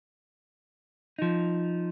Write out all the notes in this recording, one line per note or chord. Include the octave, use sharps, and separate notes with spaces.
F3 D#4